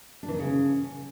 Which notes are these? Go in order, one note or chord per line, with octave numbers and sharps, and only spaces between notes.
D4
E3
D#3
C#3